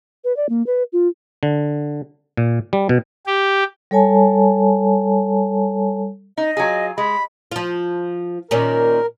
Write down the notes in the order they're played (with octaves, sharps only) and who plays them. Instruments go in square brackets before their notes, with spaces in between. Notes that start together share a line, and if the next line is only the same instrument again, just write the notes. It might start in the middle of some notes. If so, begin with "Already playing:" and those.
[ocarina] B4
D5
A#3
B4
F4
[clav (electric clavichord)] D3
A#2
G3
B2
[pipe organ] G4
[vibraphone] G3 A4 C#5 G#5 A5
[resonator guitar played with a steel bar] D#4 [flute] D#5
[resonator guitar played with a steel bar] F#3 F4 G#4
[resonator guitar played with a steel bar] G#3 [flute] B5
[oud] F3 F4
[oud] A#2 D#3 C#4 [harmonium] A#4